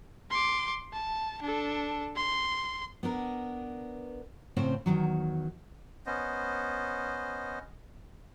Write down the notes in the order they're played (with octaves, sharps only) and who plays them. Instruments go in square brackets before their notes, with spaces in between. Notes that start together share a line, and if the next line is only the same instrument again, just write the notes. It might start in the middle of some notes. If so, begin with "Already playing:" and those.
[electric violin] C6 D6
A5
D4 A4
C6
[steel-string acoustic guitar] B3 D4 A#4
A2 C#3 C4 C#4 C5
E2 B2 D#3 F#3
[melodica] B3 C#4 C5 D#5